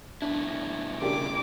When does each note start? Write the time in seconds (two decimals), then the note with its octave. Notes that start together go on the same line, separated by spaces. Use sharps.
0.22 G2 B2 D4 E4
1.02 C#3 D4 G4 A#4 D6